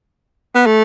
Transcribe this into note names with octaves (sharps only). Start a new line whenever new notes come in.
B3
A3